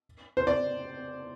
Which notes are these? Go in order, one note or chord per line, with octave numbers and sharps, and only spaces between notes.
C5
D5